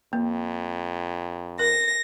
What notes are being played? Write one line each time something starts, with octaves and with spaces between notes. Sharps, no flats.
F2 A#3
A#4 A#6